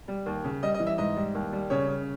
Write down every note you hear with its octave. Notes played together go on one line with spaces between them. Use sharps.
G3
D#2
C#3
G3 D#5
D#5
E3
E5
G#2 D#5
G3
D#2
G3
C#3 C#5
C#3